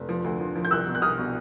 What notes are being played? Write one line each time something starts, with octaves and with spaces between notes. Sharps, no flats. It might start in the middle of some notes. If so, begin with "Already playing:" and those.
Already playing: F1
F3
D2
F3
F3
G6
C2 E6 F#6
B2
F#6
C2 D#6 F6
B2